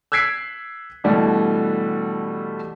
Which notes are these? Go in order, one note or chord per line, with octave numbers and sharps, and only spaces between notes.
E6 F#6 G#6 B6 C7 D7
B2 D3 E3 G3 A3